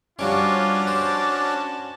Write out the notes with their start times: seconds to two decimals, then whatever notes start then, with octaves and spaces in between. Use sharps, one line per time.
0.19 F3 G3 C#4 D4 F4 F#4 C#5 D6
0.87 C5 A5